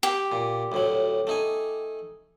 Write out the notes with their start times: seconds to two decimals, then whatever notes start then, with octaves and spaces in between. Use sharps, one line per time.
0.03 G4
0.32 A#2
0.72 D2 A2 F#3
1.27 A3 D#4 G#5